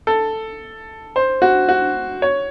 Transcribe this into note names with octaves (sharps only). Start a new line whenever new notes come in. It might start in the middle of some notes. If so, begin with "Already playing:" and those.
A4
C5
F#4
F#4
C#5